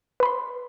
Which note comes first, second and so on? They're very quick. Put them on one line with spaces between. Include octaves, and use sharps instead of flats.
B4 B5 C6